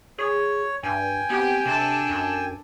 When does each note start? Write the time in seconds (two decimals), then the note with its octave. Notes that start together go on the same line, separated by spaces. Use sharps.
0.18 G#4 C#5
0.83 G2 G5 G#5
1.30 B3 C4 G4
1.66 C3 D4 A4
2.09 F#2